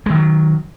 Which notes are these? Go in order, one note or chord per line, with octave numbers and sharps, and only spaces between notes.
D#3 F#3 G#3